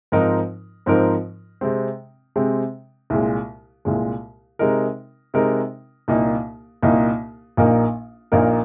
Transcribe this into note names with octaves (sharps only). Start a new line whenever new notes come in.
G#2 F3 C4 D#4 A#4
G#2 F3 C4 D#4 A#4
C3 G#3 C4
C3 G#3 C4
C2 A#2 G#3
C2 A#2 G#3
C3 G#3 D#4 A#4
C3 G#3 D#4 A#4
C2 A#2 A#3 D#4
C2 A#2 A#3 D#4
A#1 A#2 A#3 D#4 A#4
A#1 A#2 A#3 D#4 A#4